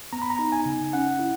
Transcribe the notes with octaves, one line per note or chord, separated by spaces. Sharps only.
B3 A#5
B5
A#5
D#4
G#5
C#3
C#4 F#5
E4